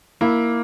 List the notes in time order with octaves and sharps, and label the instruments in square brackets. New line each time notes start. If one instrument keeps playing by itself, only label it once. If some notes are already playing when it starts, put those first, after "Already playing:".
[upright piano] A#3 [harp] E4